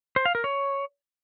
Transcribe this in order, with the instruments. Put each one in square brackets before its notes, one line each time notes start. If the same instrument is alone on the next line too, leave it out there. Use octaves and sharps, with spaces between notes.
[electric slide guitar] C5
F5
A#4
C#5